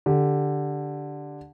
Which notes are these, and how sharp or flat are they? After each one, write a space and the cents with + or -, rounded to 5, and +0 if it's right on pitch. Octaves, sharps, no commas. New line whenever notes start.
D3 +0 G4 +0